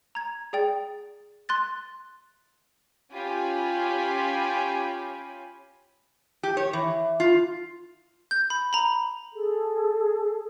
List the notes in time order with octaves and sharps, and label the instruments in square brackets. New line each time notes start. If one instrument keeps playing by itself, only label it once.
[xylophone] A#5 G#6
G#4 D5 G5 A6
C6 F#6 A6
[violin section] C#4 F4 G4 G#5 B5
[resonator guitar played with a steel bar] G4
C#5
E3
F4
[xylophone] G6
B5
A#5 B5
[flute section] G#4 A4